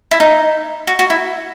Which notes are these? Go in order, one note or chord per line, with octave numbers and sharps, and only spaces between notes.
E4
D#4
F#4
F#4
E4